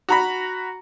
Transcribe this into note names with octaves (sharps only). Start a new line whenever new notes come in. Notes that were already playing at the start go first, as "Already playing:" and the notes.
F#4 A#5 B5